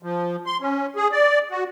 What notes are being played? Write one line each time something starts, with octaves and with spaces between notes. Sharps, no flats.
F3
C6
C#4
G#4
D5
F#4